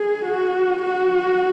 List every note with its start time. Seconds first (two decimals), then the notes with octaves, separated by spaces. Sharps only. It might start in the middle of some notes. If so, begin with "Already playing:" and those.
Already playing: G#4
0.25 F#4
0.85 F#4